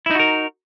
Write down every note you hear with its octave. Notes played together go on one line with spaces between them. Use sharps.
D#4 E4 F#4 A#4